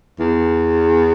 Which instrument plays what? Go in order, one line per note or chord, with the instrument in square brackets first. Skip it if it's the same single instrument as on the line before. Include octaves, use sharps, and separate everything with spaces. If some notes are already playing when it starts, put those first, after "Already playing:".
[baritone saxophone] E2